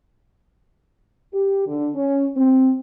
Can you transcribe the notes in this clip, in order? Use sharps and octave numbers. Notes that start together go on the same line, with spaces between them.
G4
D3
C#4
C4